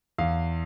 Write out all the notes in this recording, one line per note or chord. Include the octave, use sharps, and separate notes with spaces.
E2 F5